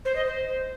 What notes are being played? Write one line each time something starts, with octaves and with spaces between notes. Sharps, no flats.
C5
D#5
C5